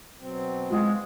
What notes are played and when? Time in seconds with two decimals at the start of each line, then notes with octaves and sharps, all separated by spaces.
0.19 B2 F#3 C4
0.70 G#3 F4 F#4